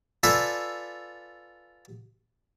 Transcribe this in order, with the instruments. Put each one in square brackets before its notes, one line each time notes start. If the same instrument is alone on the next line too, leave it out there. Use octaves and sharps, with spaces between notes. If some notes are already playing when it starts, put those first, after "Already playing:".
[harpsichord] F4 A4 B4 D5 E5 G#5